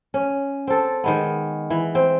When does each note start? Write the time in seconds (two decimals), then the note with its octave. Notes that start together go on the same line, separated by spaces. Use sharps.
0.14 C#4
0.67 C4 A4
1.04 D#3 G#3 B3
1.70 E3
1.95 C4